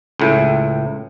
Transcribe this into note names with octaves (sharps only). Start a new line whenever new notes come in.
C#2 A2